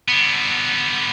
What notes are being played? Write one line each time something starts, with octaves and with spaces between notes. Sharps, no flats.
D3 B3